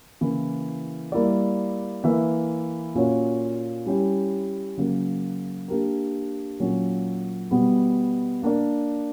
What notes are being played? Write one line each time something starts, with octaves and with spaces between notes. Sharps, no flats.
C#3 E3 A#3 E4
G3 A#3 E4 A#4 D5
E3 A#3 E4 B4 E5
A#2 A#3 C#4 F#4 C#5
G3 C#4 E4 G4
C#3 F#3 A#3
A#3 D4 G4 A#4
A#2 F#3 A#3 C#4
B2 G3 B3
A#3 D4 A#4 D5